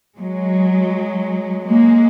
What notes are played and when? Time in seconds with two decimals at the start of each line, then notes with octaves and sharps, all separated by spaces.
0.18 F#3 G#3
1.65 G#3 A#3